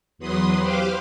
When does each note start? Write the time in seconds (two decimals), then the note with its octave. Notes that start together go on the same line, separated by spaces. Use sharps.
0.18 E2 F#3 B4 C6 D#6
0.58 G4 B4 C5 F5 D6